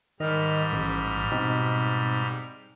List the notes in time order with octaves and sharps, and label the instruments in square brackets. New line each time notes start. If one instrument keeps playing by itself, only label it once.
[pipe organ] G#2 G3 F6 [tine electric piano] D#3 D#5
[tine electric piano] A1
B2 C4 D#4